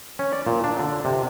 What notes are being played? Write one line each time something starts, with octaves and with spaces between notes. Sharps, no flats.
C#4
D5
A#2
D4
D3
C3